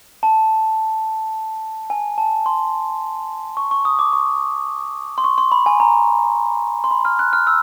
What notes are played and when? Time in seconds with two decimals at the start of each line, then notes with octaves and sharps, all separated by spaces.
0.23 A5
1.90 G#5
2.18 A5
2.46 C6
3.57 C#6
3.71 C#6
3.85 D#6
3.99 D6
4.13 C#6
5.18 C6
5.24 C#6
5.38 C6
5.52 B5
5.66 G#5
5.80 A#5
6.84 C6
6.91 B5
7.05 F6
7.19 F#6
7.33 F6
7.47 E6